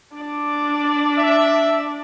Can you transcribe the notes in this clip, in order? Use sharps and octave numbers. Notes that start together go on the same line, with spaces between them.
D4 D5
E5